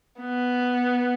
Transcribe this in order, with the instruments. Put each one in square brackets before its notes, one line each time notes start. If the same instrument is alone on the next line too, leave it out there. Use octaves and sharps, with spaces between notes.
[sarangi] B3